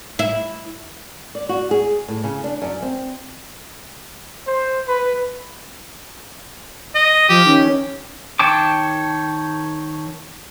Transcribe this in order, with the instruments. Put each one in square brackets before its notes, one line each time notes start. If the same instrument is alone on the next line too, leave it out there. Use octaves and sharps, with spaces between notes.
[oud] E4
[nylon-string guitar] D5
F#4
G#4
A2
C#3
D4
F#2
C4
[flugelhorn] C5
B4
[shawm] D#5
[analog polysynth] F3 F5 [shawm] G4
[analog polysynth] D#3 C#4
[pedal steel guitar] D#3 C#5 G5 A5 D6